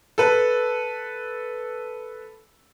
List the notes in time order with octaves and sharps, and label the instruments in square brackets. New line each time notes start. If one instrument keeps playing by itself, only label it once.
[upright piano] A4 B4